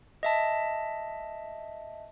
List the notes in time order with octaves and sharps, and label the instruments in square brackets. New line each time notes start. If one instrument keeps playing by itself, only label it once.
[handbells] D#5 E5 A5